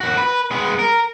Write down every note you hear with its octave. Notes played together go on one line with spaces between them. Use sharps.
D#2 F#4
B4
G#3 B3
A#4